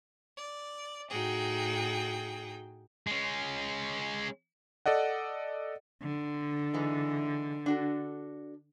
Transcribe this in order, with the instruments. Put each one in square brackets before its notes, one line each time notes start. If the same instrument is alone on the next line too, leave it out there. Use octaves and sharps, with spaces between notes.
[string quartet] D5
A2 D#4 F#4 G#4 G5
[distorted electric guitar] G#3 C#4
[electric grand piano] A4 D5 D#5 F#5
[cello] D3
[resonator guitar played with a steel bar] E3 G#3 D#4
D4 F#4 A4